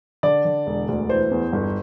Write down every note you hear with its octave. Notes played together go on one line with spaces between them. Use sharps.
D3 D5
D3
E1
D2
E3 C5
E2
G1